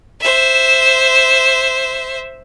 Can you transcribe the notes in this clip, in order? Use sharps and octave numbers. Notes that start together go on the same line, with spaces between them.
C5 E5